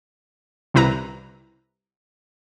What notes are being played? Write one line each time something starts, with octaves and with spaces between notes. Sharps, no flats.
C2 C3 E4 B4 A#5